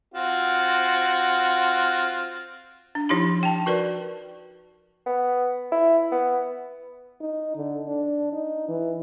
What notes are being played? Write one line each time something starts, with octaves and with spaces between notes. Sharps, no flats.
C4 F4 F#4
D4
F3 D#4 E4 G4 B5
G5 A5
F#4 A#4 B4 D5
B3
E4
B3
D#4
D3
D4
D#4
E3